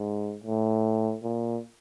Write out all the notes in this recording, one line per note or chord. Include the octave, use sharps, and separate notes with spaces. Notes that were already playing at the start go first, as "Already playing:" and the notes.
Already playing: G#2
A2
A#2